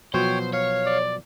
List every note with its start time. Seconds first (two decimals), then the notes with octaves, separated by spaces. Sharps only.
0.14 B2 F3 F#3 C5 C#5 G5
0.53 C#5 F5
0.86 D5